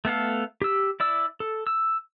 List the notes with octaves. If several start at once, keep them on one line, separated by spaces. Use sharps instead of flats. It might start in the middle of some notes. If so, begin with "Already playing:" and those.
A3 B3 A4 F5
G4 E6
E4 D5 E6
A4
E6